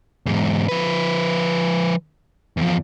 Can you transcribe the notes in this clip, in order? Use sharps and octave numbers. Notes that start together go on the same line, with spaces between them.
E2 G#2
F3 B4
E2 F3